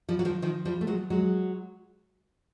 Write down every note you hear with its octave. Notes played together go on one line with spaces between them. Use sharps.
F3 G3
F#3
D#3 F3
D#3 F3
F3 G3
A3
F#3 G#3
F#3 G#3